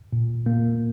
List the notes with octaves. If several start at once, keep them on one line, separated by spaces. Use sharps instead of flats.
A#2
A#2 A#3